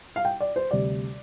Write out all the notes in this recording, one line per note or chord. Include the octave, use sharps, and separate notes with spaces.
F5
G5
D5
C5
D2 C3 G3 D5